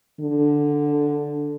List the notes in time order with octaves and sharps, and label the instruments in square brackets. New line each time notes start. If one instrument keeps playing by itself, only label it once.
[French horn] D3